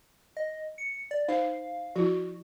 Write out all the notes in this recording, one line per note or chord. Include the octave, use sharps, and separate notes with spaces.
D#5
C#7
D5
D#4 C5 F5
F3 E4 F#4